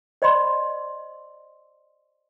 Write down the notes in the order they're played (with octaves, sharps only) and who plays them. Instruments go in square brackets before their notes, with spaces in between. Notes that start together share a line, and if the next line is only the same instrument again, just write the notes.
[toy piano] C5 D5 D#5 B5 C6